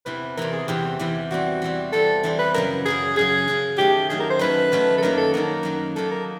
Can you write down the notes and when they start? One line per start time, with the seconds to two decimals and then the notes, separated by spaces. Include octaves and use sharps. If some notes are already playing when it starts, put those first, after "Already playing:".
0.06 E2 C3 E3 B4
0.37 E2 C3 E3 A#4
0.53 G#4
0.68 E2 C3 E3 G4
0.99 E2 C3 E3
1.31 E3 G3 C4 F#4
1.62 E3 G3 C4
1.92 E3 G3 C4 A4
2.23 E3 G3 C4
2.39 B4
2.54 F#2 C#3 F#3 A#4
2.86 F#2 C#3 F#3 G#4
3.16 F#2 C#3 F#3 G#4
3.48 F#2 C#3 F#3
3.77 D#3 F#3 A3 C#4 G4
4.09 D#3 F#3 A3 C#4 G#4
4.20 A#4
4.30 C5
4.39 D#3 F#3 A3 C#4 B4
4.72 D#3 F#3 A3 C#4
4.98 A4
5.02 F#2 D#3 F#3 A#3 A#4
5.18 A4
5.34 F#2 D#3 F#3 A#3 A#4
5.63 F#2 D#3 F#3 A#3
5.96 F#2 D#3 F#3 A#3 A4
6.11 A#4